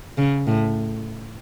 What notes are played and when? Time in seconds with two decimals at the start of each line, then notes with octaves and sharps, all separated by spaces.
0.18 C#3
0.47 A2